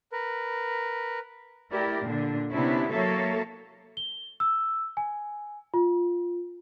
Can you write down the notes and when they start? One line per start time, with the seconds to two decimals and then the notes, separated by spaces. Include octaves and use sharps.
0.12 A#4 B4
1.71 A3 E4 G4 A#4 D5
2.02 A#2 D3 D4
2.51 C3 B3 C#4 D4 E4
2.92 F#3 A#3 A4 C#5 E5
3.97 G7
4.40 E6
4.97 G#5
5.74 F4